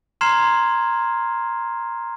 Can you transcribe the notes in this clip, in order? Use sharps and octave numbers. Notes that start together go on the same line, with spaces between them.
A#5 C6 F6 G#6 C7 E7